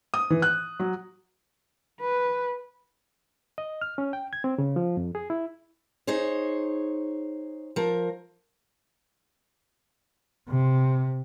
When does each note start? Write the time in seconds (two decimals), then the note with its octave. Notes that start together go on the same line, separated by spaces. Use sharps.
0.14 D#6
0.30 E3
0.42 F#6
0.80 F#3
2.01 B4
3.58 D#5
3.81 F6
3.98 C#4
4.13 G5
4.33 G#6
4.44 C4
4.58 C#3
4.76 F3
4.97 F2
5.15 G#4
5.30 E4
6.07 D#4 G#4 C5 C#5
7.76 F3 A#4
10.48 C3